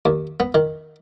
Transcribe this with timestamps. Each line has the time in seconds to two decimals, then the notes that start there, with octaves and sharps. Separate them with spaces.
0.05 D#2
0.40 B3
0.54 D#3